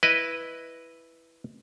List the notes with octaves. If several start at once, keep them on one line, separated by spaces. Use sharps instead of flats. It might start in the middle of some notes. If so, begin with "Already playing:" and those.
E4 B4 D#5